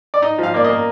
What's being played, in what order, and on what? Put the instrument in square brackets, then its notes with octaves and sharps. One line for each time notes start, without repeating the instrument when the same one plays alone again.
[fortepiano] D5
D#4 D#5
F3 F5
A#3 D5
A#3 D#5